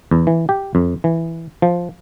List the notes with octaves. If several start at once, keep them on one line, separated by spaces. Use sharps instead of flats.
E2
E3
G4
F2
E3
F3